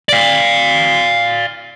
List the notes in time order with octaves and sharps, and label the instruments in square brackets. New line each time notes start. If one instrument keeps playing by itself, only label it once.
[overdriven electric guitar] D5 F5